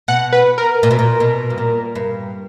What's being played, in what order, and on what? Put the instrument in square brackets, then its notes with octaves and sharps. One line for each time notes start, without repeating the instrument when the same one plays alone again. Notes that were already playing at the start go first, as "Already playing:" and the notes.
[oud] B2 [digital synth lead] F#5
[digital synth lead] B4
A#4
[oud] A#2
B2
A#2
B2
G2
A#2
G2